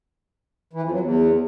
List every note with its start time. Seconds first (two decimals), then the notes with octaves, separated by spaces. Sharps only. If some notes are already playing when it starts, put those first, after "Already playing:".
0.73 E3
0.82 F2
0.92 F#3
1.01 E2